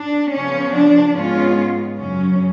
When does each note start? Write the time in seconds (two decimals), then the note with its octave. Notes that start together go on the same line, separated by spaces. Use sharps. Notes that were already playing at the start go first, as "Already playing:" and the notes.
Already playing: D4
0.34 C#3 F3 B3 C#4
0.75 D4
1.16 G#2 G#3 B3 C#4 F4
1.98 F#2 C#3 F#3 C#4